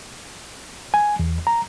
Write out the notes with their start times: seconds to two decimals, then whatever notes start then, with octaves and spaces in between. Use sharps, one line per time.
0.94 G#5
1.19 E2
1.47 A#5